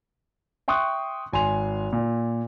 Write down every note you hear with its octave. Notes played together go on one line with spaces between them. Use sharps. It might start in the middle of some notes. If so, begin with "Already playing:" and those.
E5 G5 C6 C#6 D#6 F#6
G#1 G#5 C6 F7
A#2